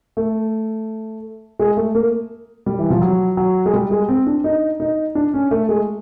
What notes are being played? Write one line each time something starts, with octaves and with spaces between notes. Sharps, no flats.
A3
G#3
A3
A#3
G3
E3
F3
F#3
F#3
G#3
G3
G#3
C4
D4
D#4
D#4
D4
C#4
A3
G#3